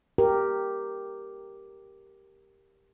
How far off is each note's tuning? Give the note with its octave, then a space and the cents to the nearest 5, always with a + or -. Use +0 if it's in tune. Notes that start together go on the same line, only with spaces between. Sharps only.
G4 +0 A#4 +0